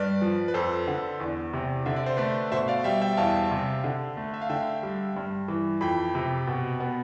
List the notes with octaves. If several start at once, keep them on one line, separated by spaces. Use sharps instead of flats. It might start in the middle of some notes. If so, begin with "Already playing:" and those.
Already playing: G2 B4 D5
F3
B4
F2 A4 C5
D3
E2
C3
D3 E5
D5
C5
A3 B4 D5
B2 C5 E5
D5 F5
G3 E5 G5
E5 G5
E2 F5 A5
C3
D3
A3
E5
F5
D3 E5 G5
G3
G2
E3
F2 G5 B5
C3
B2
B3